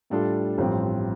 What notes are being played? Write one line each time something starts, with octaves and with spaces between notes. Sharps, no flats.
A2 G3 D4 F4 A4
A1 G2 F3 C4